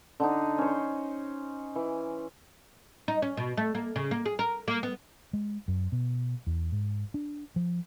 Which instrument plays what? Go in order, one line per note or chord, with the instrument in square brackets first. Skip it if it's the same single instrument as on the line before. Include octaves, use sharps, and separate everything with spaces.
[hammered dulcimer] D3 D4 D#4
C#4 C5
E3
[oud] D#4
C#4
B2
A3
A#3
C#3
A#3
G#4
A#4
A#3
B3
[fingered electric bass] G#3
F#2
B2
E2
G#2
D4
F3